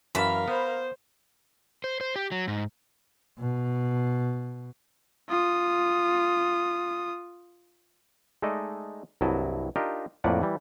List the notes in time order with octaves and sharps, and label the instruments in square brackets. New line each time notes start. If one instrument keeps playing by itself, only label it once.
[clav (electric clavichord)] F#2 E3 A5 [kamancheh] A#4 F5 [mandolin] B5
[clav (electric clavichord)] B3 [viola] C5
[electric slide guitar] C5
C5
G4
F#3
G#2
[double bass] B2
[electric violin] F4 D#6
[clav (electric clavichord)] G#3 A3 D#4 A4 D5 D#5
C2 G2 F#3 E4 D#5 A5
D4 D#4 F4 G4 A#4 D#5
F2 A2 A#3 B4 D5 F#5
E3 G3